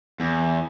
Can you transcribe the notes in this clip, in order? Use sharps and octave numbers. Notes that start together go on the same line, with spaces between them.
E2